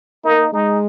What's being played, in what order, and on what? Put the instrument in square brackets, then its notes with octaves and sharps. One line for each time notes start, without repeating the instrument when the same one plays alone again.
[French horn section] A#3 [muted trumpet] D#4
[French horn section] G#3 [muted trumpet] D#4